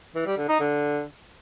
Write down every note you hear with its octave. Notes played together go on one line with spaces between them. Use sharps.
E3
G3
D3
D#4
D3